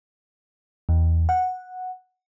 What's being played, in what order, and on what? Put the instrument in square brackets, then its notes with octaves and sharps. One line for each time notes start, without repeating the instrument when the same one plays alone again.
[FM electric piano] E2
F#5